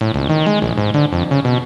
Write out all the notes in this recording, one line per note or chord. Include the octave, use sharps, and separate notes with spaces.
A2
C#2
D#3
G#3
A#1
G#2
D3
F2
C#3
B2